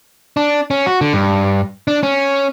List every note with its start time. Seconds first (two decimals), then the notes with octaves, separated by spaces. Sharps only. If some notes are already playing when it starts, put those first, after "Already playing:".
0.37 D4
0.71 C#4
0.86 F#4
1.01 D3
1.13 G2
1.88 D4
2.03 C#4